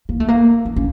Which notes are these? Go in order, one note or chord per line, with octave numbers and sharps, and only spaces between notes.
A#3
A3
A#3
C#4
C#4